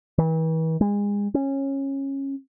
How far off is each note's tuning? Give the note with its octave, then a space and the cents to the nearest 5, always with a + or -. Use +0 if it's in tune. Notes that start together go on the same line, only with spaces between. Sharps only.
E3 -40
G#3 -30
C#4 -20